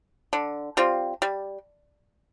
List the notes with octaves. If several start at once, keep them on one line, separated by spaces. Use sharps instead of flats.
D3
G3 C4 F4
G3